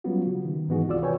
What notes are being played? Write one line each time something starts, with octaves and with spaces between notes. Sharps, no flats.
F#3 G3 B3 C#4 F4 F#4
C#3
D#3
G#2 E3 B3 D#4 F#4 G#4
D2 C3 F4 F#4 D5 E6
B4 C#5 G5 G#5